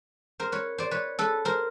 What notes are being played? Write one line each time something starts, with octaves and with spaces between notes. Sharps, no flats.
A#4 C5
B4 C#5
C5 D5
B4 C#5
A4 B4
A#4 C5